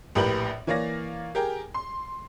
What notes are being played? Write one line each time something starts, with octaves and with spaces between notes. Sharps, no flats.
A#1 A2 G4 A#4 B4 F#7
E3 A#3 C#5 D5 F5 A#6
G4 G#4 A#4 G5
C6